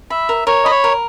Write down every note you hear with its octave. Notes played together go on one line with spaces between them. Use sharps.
E5 B5
A#4
A#4 C#5
D#5 B5
C#5
A#4